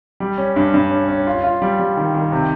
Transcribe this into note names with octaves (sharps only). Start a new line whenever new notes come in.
G3
C#4
G2
G2
C#4
C#4
F4
F4
G3
G3
D#3
D#3
C3